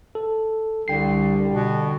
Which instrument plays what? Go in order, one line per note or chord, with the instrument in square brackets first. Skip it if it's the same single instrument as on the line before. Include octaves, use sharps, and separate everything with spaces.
[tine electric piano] A4
[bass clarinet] C2 [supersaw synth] D3 [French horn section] G3 [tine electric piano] G5 C7
[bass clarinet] B2